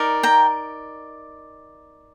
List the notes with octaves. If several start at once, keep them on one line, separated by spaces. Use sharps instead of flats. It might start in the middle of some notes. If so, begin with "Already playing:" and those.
Already playing: D#4 A#4 D5
G5 A#5